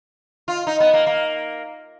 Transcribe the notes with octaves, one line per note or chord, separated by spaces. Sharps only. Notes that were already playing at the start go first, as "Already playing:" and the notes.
F4
D#4
B3
A#3
A#3